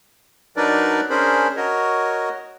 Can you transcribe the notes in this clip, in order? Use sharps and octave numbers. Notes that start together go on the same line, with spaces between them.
F#3 D4 D#4 A#4 B4 D5
C#4 D4 G#4 A#4 C5 B5
F#4 A#4 C#5 D#5